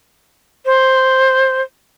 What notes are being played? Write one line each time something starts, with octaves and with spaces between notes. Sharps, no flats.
C5